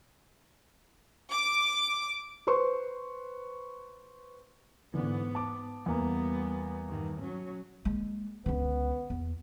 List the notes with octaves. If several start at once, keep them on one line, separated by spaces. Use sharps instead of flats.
D6
B4 C5 C6 C#6
G#2 D3 E3 B3
A5 D6
E2 G3 A#3 B3
G2 D#3
F#3 C#4
G#3 A#3
C#2 D3 B3
E2